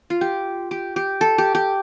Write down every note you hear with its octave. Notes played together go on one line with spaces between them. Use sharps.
F4
G4
G4
G4
A4
G4
G4